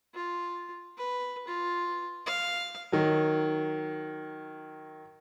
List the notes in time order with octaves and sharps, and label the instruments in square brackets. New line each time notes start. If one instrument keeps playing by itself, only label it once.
[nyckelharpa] F4
B4
F4
F5
[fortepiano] D#3 F#3